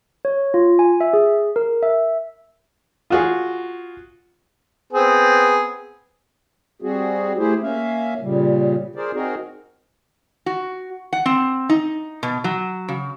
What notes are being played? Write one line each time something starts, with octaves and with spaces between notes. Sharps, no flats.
C#5
F4
G#5
E5
G#4
A#4
E5
F4 F#4 G#4
B3 C4 G#4
G3 C4 F#4 G#4
A3 E4 G4 G#4 C5
A#3 C#4 E5 F5
A#2 C#3 G3
G#4 A#4 C5 D5
C4 D#4 F#4 G#4 A#4
F#4
F#5
C4
D#4
B2
F#3
C#3